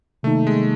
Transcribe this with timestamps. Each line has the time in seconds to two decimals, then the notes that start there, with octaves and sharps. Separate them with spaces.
0.23 C3 D#3 G3 A3 A#3 D#4
0.47 G#3